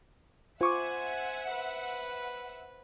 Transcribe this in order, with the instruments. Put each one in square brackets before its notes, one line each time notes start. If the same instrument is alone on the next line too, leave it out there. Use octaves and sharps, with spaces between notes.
[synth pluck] F4 C#6 D6 [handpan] C5 [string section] E5 F#5 [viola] G#5
[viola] B4